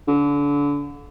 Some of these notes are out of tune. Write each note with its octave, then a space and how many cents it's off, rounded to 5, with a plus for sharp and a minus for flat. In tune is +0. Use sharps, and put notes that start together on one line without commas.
D3 -30